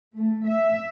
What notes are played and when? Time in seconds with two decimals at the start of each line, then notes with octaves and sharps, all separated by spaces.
0.14 A3
0.45 E5